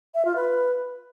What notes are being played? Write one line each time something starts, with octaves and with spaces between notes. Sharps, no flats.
E5
F4
B4